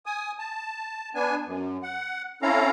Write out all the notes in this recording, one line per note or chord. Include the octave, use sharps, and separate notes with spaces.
G#5 D#6
A5
B3 D4 G#5
F#2
F#5
C4 C#4 E4 A4 F5 A#5